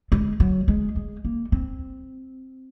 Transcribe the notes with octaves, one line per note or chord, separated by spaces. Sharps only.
G#3
F#3
G#3
G#3
A#3
C4